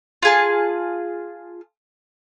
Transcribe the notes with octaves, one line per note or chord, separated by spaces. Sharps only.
F4 G#4 A5